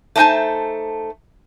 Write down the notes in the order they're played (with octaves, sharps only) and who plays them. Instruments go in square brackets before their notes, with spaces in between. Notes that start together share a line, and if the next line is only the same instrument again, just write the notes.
[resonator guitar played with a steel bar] A3 D4 D#4 C5 G#5 A5